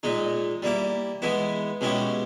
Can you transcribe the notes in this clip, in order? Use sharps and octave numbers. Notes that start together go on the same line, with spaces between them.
A#2 G#3 D#4
G3 A#3 E4
E3 G#3 B3 E4
B2 G#3 C#4 E4 G4